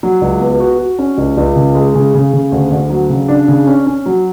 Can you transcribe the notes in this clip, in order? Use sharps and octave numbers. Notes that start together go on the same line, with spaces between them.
F#3
C#2
B3
F#4
F#4
C#4
C#2
C#2
C#3
G#3
C#3
C#3
C#3
D2
D2
F#3
C#3
D4
C#3
C#4
C#4
F#3